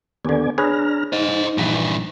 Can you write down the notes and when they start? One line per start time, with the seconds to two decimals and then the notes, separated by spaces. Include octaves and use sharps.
0.25 D#2 D3 B3 D5 G#5
0.58 D4 G#4 B4 C#5 A#5 F6
1.13 D#4 C5 D#5
1.58 A#1 G2 E3